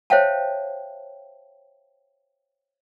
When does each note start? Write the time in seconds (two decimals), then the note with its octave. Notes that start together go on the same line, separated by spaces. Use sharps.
0.10 C5 C#5 E5 F5 G5 A5